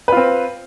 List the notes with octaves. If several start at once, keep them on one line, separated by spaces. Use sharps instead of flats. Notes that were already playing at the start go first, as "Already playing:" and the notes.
C4 F4 B4